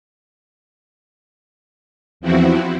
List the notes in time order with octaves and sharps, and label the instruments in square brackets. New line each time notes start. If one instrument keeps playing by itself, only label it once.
[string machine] E2 F3 C4 E4 F#4